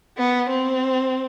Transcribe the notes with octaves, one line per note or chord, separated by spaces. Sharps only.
B3
C4